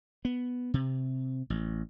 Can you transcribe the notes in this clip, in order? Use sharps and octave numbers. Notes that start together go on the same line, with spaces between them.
B3
C3
A1